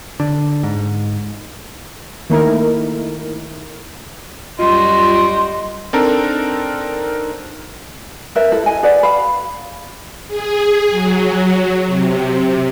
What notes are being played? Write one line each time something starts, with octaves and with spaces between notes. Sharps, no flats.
D3
G#2
D#3 A3 A#3 D#4 E4 A#4
F#2 G3 F4 F#4 D#5 C6
C4 D4 D#4 A4 A#4
A#4 B4 E5
E4 A4
D#5 G#5
G#4 B4 D5 F#5
F5 B5
G#4
F#3
C3